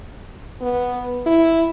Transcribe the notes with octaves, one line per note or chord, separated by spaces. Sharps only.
B3
E4